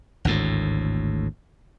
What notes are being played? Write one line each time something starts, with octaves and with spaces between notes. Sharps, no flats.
G#1 D2 A2